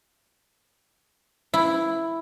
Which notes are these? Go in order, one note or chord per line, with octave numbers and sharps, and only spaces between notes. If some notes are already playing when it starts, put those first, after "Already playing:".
E4